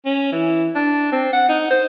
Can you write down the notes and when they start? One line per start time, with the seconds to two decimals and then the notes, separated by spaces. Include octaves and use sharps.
0.05 C#4
0.32 E3
0.75 D4
1.12 C4
1.33 F#5
1.49 D#4
1.71 C5